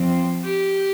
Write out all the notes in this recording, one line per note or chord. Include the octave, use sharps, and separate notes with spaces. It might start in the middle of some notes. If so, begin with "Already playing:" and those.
Already playing: F3 C4
G4